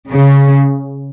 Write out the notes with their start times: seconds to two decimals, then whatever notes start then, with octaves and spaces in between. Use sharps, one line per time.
0.10 C#3